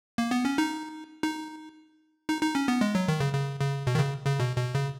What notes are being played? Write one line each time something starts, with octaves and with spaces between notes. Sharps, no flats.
A#3
B3
C#4
D#4
D#4
D#4
D#4
C#4
B3
G#3
F#3
D#3
C#3
C#3
C#3
B2
D#3
C#3
C#3
B2
B2
C#3